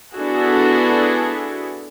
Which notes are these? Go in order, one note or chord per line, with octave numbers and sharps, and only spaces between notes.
B3 D4 E4 F#4 G#4 A4